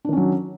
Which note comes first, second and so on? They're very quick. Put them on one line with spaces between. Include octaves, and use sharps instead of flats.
D4 D#3 C#4 F#3